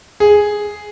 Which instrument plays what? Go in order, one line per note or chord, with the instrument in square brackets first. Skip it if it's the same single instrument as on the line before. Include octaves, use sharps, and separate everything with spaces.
[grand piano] G#4